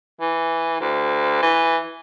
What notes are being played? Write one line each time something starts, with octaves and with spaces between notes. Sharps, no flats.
E3
D2
E3